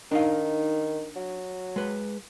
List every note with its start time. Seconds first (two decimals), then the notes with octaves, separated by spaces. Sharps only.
0.11 D#3 D4 D#4 F5
1.16 F#3
1.76 G#3 B4